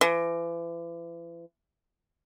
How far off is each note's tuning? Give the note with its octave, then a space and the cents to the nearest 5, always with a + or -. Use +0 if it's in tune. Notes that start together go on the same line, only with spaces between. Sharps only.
E3 +40